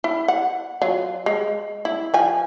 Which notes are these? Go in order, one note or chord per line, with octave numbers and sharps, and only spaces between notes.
E4
F#5
F#3 F4
G#3
E4
F3 G#5